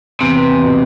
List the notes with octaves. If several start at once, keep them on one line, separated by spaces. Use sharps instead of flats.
E2 C3
B3
E2
B2